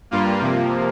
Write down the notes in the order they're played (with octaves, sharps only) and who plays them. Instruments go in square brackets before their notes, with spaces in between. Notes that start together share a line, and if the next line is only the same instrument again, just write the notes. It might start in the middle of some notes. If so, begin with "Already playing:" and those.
[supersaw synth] G2 G3 A#3 F4
C3 F3 A#3